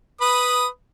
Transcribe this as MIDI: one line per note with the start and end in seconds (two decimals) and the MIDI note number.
0.21 0.66 71
0.21 0.66 83
0.21 0.66 87